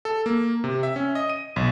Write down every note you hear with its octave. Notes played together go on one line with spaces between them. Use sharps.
A4
A#3
C3
E5
C#4
D#5
D#7
B1